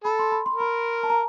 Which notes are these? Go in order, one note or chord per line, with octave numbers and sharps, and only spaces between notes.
A4 B5
C6
B5
C6
A#4
B5
A5
A#5